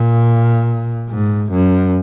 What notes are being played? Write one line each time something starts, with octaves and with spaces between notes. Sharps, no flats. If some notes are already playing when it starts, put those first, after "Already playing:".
Already playing: A#2
G#2
F#2